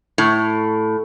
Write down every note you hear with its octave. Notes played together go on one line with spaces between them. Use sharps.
A2